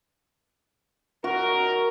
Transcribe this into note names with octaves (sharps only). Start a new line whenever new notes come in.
F#2 D#3 F#4 A#4